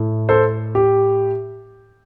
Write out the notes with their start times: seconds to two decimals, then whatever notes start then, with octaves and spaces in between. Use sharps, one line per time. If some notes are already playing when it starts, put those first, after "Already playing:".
Already playing: A2
0.29 A4 C5
0.75 G4